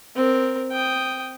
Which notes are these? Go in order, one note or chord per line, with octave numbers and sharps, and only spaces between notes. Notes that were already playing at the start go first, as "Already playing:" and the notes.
C4 A#4
G5 D#6